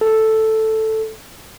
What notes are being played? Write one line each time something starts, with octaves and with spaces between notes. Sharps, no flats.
A4